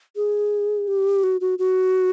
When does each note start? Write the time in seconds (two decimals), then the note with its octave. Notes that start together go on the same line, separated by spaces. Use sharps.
0.16 G#4
0.88 G4
1.23 F#4
1.41 F#4
1.59 F#4